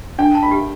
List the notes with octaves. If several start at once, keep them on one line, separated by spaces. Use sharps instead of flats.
D4 G5
A5
B5
G4